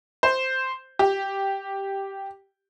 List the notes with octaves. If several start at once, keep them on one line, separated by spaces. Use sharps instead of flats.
C5
G4